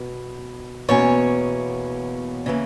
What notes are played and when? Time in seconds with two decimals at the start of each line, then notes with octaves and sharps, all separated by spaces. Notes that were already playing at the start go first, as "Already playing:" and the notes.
Already playing: B2
0.89 E2 B2 A#3 C#4 C#5
2.46 C#3 E3 A#3